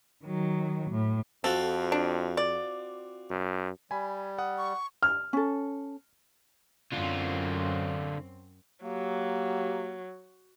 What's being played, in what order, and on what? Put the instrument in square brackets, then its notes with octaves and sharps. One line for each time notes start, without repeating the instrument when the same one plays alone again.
[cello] D#3 F#3
A2
[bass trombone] F2 [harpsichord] C4 F4 F#4 [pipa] A4
[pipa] D4
D5
[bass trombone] F#2
[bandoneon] G3 [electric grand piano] G#5 B5
[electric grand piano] F#5 D#6
[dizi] C#6
[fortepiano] F6
[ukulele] C#4 A4
[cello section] F#2 C4 [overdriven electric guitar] D3 F4
[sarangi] F#3 [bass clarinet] A#3 [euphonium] G4